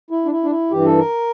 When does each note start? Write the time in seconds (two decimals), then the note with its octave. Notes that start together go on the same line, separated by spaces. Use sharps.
0.10 E4
0.25 D4
0.31 E4
0.44 D4
0.51 E4
0.71 G2 E3 G4
0.85 A4
0.98 A#4